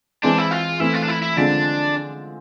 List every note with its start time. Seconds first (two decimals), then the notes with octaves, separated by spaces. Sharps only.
0.23 E3 G#3 C4 D4
0.38 E4
0.51 F4
0.80 E3 A3 C4 E4
0.94 F4
1.03 D4
1.09 E4
1.22 E4
1.37 D3 F3 G#3 C4 D4 F4